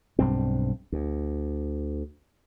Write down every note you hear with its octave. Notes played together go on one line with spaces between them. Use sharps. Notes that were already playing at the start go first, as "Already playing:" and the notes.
B1 G2 C4
D2